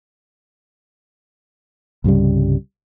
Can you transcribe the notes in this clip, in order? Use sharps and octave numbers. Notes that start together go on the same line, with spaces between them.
C2 G2 C#3 G3